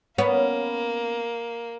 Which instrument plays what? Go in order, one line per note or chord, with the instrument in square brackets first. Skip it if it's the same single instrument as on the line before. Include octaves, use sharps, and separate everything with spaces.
[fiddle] A#3 [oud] B3 C#4